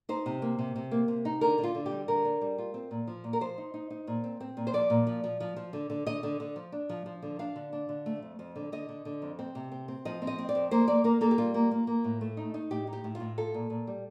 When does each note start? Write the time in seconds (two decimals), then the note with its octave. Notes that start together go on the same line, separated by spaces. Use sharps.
0.09 D#4 C5
0.26 C3
0.42 A#3
0.59 C3
0.76 C3
0.91 A#3
1.08 C3
1.25 D#4
1.41 D3 A#4
1.58 D3
1.64 F4
1.75 D3
1.86 G4
1.91 G3
2.08 D3 A#4
2.25 D4
2.41 G3
2.58 F4
2.74 C4
2.91 A#2
3.08 F3
3.24 A#2
3.33 A#4
3.41 F3 C5
3.58 D#4
3.74 D#4
3.91 D#4
4.07 A#2
4.24 C4
4.40 C4
4.57 A#2
4.67 C5
4.73 F3 D5
4.90 A#2
5.07 F3
5.24 F3
5.40 F3
5.56 F3
5.73 D3
5.90 D3
6.07 D3 D#5
6.23 D3
6.40 D3
6.56 F3
6.72 D4
6.89 F3
7.06 F3
7.22 D3
7.39 D4 F5
7.56 D3
7.73 D4
7.89 D3
8.06 A3
8.22 F2
8.39 F2
8.56 D3
8.72 D3 D#5
8.89 D3
9.05 D3
9.22 F2
9.39 C4
9.55 C3
9.72 C4
9.88 C4
10.05 F3 D#5
10.22 C4
10.27 D#5
10.38 C4
10.49 D5
10.55 F2
10.71 A#3 C5
10.88 A#3 D5
11.04 A#3 A#4
11.21 A#3 A4
11.31 G4
11.38 G3 F4
11.54 A#3
11.71 A#3
11.87 A#3
12.04 A2
12.21 A3
12.37 D#4
12.54 D#4
12.70 A2 G4
12.87 D#4
12.93 G4
13.04 A2
13.15 F4
13.20 A2
13.38 F4 A4
13.54 A#2
13.70 A#2
13.87 G3